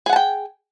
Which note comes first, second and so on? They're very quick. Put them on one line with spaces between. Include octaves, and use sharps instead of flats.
G#4 F#5 A5 G5